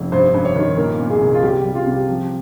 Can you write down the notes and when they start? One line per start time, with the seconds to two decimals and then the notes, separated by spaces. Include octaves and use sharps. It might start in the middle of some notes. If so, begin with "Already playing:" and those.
Already playing: F1
0.12 G2 C5
0.34 G2
0.45 C#5
0.56 D#3
0.77 A#2 A#4
0.99 A#2
1.10 G#4
1.21 C2
1.34 F4
1.43 G3 G4
1.59 G4
1.64 G3
1.75 F4
1.86 C3
1.91 G4
2.08 F3